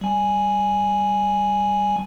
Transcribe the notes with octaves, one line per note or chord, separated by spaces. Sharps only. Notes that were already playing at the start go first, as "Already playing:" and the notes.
G3 G#5